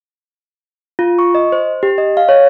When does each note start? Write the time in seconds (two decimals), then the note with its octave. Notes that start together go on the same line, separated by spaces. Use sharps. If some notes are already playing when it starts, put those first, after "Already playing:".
0.99 F4
1.19 C#6
1.35 D#5
1.52 C5
1.83 G4
1.98 D#5
2.17 F5
2.29 C#5